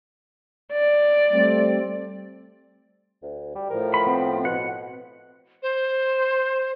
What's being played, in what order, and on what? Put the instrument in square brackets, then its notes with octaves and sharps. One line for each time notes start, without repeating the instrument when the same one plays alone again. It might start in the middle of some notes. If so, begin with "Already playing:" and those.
[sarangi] D5
[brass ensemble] G3 A3 C4
[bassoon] D2
G3
[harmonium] A2 F3 [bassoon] A#4
[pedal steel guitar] B5
[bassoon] B3 [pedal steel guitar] C4
[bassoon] B2 [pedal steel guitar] F#5
[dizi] C5